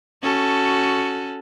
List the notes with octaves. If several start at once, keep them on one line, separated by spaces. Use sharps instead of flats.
C#4 F#4 A4